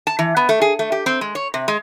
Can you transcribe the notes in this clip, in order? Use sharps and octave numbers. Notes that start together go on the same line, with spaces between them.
A5
E3
B3
A3
G#4
A3
G4
C4
G#3
C#5
C3
G#3